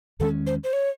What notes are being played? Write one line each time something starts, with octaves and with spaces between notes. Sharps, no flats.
E2 D#3 G#3 C#4 A4
C5
C5
C#5